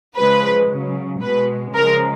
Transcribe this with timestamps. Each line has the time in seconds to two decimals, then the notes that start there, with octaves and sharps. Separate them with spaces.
0.17 C#3 F3 G#3 B4
0.70 C#3 F#3
1.22 B2 G#3 B4
1.75 C#3 F3 G#3 A#4